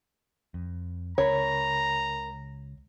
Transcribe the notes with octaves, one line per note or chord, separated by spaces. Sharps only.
F2
C#2 C#3 A#4 C#5 A#5 B5